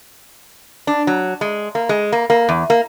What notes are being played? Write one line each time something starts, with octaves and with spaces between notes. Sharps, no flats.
D4
F#3
G#3
A#3
G#3
A#3
A#3
E2
A#3